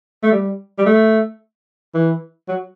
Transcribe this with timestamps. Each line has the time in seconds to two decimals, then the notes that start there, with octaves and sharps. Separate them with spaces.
0.23 A3
0.32 G3
0.78 G3
0.86 A3
1.94 E3
2.49 F#3